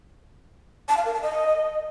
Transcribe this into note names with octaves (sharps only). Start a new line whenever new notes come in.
A5
F5
A#4
A5
D#5